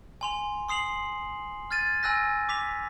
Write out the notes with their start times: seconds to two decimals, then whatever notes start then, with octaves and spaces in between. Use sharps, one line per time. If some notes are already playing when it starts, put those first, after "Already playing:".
0.21 G#5 C6 F7
0.68 C6 D#6 C7 F7 F#7
1.71 F6 G#6 A6 D#7
2.03 G#5 E6 F#6 A#6
2.49 D6 B6 F7